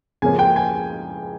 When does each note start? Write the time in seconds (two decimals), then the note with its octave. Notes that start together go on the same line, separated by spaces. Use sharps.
0.22 C#2 C#3 F3 A#3 C#4 G#5
0.39 G5
0.56 G#5